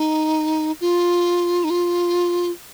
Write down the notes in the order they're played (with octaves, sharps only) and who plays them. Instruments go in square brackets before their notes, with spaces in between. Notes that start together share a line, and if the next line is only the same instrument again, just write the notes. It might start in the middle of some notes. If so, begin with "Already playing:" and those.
Already playing: [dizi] D#4
F4
D#4
F4